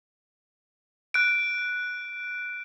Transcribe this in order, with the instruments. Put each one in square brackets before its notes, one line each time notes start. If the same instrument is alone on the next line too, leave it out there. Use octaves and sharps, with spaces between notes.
[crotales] F#6 D7